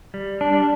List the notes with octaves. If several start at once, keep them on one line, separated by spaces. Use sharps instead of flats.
G3
D4